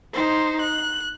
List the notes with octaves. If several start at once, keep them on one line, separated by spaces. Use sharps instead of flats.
D#4 C5
F#6